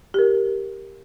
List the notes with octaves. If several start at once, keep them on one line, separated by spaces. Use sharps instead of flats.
G4 A#4